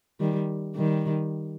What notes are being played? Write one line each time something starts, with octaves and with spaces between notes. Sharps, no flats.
D#3 G3
D#3 G3